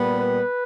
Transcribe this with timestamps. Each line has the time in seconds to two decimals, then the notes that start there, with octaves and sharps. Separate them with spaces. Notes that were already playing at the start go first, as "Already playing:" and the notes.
Already playing: A#2 G3 B3
0.18 B4